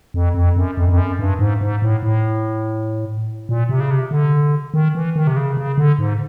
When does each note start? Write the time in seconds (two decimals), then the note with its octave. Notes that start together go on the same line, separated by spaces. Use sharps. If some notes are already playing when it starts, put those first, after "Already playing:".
0.14 F2
0.35 F2
0.56 F#2
0.77 F2
0.89 F2
0.98 F#2
1.19 G2
1.39 G#2
1.61 G#2
1.82 A2
2.03 A2
3.49 A#2
3.69 C3
3.80 C#3
3.91 C3
4.11 D3
4.74 D#3
4.95 E3
5.16 D#3
5.27 C3
5.37 C#3
5.57 C#3
5.78 D3
5.99 G#2